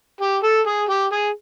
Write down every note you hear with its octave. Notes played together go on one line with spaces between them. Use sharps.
G4
A4
G#4
G4
G#4